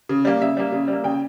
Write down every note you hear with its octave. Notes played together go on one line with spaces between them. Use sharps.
C#3
G3 A#3
C#3 E5
G3 A#3
C#3
G3
A#3
C#3 G5